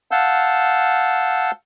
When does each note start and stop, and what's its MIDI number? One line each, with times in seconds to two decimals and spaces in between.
0.11 1.51 77
0.11 1.51 78
0.11 1.51 81
0.11 1.51 88
0.11 1.51 91